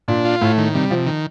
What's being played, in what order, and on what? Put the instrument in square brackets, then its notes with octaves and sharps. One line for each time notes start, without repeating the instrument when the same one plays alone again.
[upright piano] A#2 [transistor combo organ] D4
[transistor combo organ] F4
[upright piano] A2 [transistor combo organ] A3
[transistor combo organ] D#3
[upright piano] C3 [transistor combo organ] G3
[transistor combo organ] C3 [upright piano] F3
[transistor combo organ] D#3